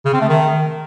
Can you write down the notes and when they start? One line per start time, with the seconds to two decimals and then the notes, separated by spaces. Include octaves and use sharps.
0.05 C#3
0.13 C4
0.21 A3
0.29 D#3